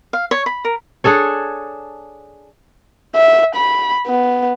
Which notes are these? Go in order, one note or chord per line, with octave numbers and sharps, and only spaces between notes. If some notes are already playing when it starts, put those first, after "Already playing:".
F5
C#5
B5
A#4
D4 G#4 A4 C#5
E5
B5
B3